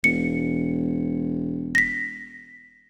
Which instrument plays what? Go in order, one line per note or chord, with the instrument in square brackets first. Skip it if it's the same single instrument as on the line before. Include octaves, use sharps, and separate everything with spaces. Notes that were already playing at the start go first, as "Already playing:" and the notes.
[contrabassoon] E1 [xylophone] C#7
[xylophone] A#6 B6